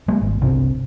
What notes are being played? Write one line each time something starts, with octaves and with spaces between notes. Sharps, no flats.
G3 G#3 A#3 B3
G#1
G1 C2 C3 C4